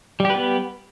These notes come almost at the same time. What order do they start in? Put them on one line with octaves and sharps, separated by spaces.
G3 G4 B4 B3